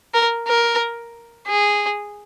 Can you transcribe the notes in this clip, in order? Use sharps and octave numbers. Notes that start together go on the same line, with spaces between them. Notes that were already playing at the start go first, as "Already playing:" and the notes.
A#4
A#4
G#4